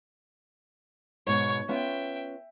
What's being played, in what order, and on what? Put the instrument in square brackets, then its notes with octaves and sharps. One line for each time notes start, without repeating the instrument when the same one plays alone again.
[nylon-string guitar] G#2 B2 [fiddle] C#5 C#6
[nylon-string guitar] B3 C#4 F4 [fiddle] E5 G5